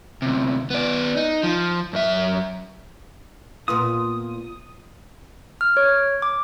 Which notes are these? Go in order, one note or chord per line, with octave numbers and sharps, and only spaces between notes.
D2 C3
B3 D5
D#4
F3
F#2 E5
A#2 B3 F4 D#6
F6
C#5
D6